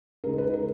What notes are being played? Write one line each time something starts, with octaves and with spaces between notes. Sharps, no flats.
C#3 G#3 D#4 A#4
B4
A#4